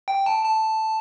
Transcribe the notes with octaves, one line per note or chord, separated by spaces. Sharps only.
G5
A5
A5